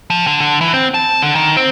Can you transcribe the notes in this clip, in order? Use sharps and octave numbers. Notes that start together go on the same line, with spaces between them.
F3
D3
D3
E3
C4
A5
D3
D#3
C4